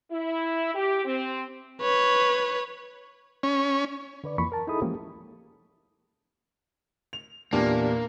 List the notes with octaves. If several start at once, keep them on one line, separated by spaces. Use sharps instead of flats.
E4
G4
C4
B4 C#5
C#4
D3 B4 D5
F2 E3 A#3 B5 C#6
A#4 A5
D#4 E4 G#4 A4 B5 D#6
E3 F3 G#3 A#3 C#4 G4
F7
E2 A#2 A#3 D4 G4